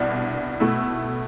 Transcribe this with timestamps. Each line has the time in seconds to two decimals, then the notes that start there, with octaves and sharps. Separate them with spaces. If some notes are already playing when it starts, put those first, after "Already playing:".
Already playing: C2 B2 D4
0.60 B2 A3 E4